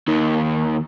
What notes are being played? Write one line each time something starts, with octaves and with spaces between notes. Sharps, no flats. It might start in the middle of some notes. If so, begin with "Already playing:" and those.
D#2 D#3